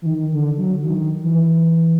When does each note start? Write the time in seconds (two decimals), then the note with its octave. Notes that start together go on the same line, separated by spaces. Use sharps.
0.02 E3
0.06 D#3
0.32 D3
0.58 F#3
0.83 D#3
1.22 E3